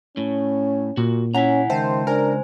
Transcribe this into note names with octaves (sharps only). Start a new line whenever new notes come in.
A2 C#4
A#2 F#4
C#4 E4 F#5 G#5 A#5 B6
C#2 D#3 C5 E5 G5 A5
D4 A#4 C5 G#5